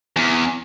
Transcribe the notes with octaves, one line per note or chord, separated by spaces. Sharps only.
E2